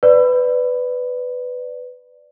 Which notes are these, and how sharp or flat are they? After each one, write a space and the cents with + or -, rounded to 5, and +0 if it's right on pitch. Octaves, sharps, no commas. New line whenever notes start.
B4 +15 D5 +0